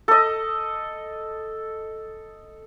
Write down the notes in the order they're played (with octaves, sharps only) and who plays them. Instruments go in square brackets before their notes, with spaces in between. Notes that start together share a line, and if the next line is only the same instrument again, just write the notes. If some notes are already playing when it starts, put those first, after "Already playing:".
[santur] A4 D#5